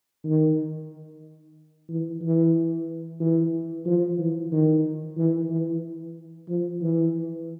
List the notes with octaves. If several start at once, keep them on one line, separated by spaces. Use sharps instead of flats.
D#3
E3
E3
E3
F3
E3
D#3
E3
E3
F3
E3